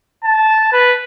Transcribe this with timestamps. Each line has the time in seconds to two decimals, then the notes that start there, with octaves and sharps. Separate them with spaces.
0.24 A5
0.72 B4